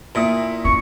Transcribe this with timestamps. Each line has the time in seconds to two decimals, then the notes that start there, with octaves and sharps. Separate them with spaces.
0.15 A#2 E4 D#6
0.65 C#4 C#6